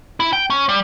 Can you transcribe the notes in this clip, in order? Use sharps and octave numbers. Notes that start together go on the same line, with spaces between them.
E4
G5
C#4
G3